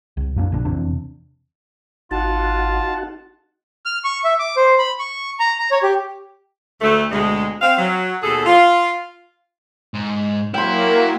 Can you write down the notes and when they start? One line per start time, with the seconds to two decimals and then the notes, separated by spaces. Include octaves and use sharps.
0.17 C2
0.36 F#2 A#3 C#4 D4
0.52 A#1 C#3 D4
0.65 F1 E2 C3 D4
2.11 G#1 D#4 F4 F#4 F#5 A5
3.85 F6
4.04 C#6
4.24 E5
4.39 D6
4.57 C5
4.79 B5
4.99 C#6
5.39 A#5
5.59 A#5
5.71 C#5
5.83 G4
6.82 D2 A3
7.12 D2 B2 G#3
7.62 C4 F5
7.79 F#3
8.22 D#2 B2 G#4 A4
8.46 F4
9.94 G#2
10.54 F#3 A#3 E4 G5 C6